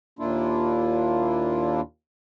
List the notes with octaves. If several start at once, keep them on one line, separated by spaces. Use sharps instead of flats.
D#2 A#2 A#3 D4 E4 F4